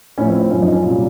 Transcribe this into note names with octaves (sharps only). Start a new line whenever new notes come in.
A2 F3 C#4
C4
C4
F#2 F3 C#4
D#4
C#4
C2 A#2 F#3